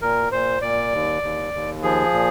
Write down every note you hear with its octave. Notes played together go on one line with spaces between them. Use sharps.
A#2 A#4
A#2 C5
A#2 D5
D#2
D#2
D#2
F3 G#4
A#2